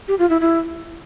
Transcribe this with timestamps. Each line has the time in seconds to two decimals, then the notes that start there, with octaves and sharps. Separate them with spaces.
0.08 G4
0.19 F4
0.30 E4
0.40 E4